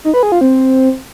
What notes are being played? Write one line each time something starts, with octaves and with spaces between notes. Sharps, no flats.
D#4
B4
G#4
F4
C4